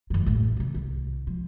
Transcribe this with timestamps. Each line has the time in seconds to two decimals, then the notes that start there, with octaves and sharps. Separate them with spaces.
0.10 F#2 D#3
0.26 A1 A2
0.57 C3 D#3
0.74 C2
1.27 F3